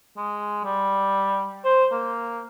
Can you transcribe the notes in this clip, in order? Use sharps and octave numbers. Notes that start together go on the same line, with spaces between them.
G#3
G3
C5
A#3